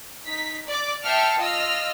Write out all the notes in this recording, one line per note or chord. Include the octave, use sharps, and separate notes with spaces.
D#4 B6
D5 D6
E5 G5 A5 F6 C7 C#7
F4 D#5 E6 F6